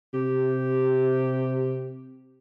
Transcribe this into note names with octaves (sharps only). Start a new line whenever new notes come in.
C3 G4